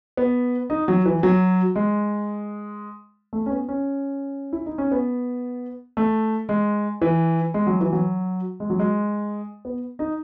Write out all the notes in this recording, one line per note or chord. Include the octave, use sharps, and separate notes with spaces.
B3
D#4
F#3
E3
F#3
G#3
A3
C#4
B3
C#4
E4
D#4
C#4
B3
A3
G#3
E3
G#3
F#3
E3
F#3
G#3
F#3
G#3
B3
D#4